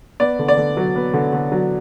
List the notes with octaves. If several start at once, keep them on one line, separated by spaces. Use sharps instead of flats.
B3 D5
D3
D5
D3
F#3
B3
D3
D3
F#3